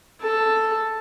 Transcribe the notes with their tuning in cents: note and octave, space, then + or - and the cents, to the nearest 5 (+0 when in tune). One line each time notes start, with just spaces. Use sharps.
A4 +5